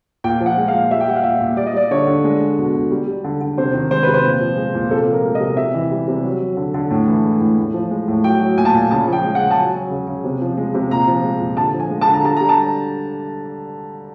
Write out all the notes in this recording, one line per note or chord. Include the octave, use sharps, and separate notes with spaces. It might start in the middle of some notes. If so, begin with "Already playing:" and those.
A#2 G5
F3
F#5
G#3
F5
A#2
G3 E5
G5
G3 F#5
F5
A#2 E5
A#2
G3 D5
D#5
G3 D5
D3 C#5
D3
G#3
G#3
B2
B2
G3
G3
D3
D3
C3 C5
D#3
G#3 C5
C3 B4
C5
A#2
F3
G#3
A#2
C3 A4
F3
A#4
G#3
D#5
C3
C3 E5
E3
G3
C3
F#3
F#3
D3
D3
A2
E3
G#3
A2
A2
F3
G#3
A2
F#3 G5
F#3
A#2 G#5
A5
A#2 G#5
C#3 A5
F3
G5
G#3
F#5
C#3
A5
F#3 G#5
F#3
C#3
C#3
C3
F3
G#3
C3
A#2 A#5
F3
G#3
A#2
D3 A5
F3
G#5
G#3
A5
D3
A#5
G3 A5
G3 A#5
A5